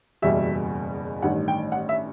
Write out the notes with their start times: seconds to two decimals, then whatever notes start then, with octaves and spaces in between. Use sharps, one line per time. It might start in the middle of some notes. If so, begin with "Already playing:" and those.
0.22 F#1 E2 B2 G3 E5
1.22 A1 G2 D#3 F#5
1.48 G5
1.72 F#5
1.89 E5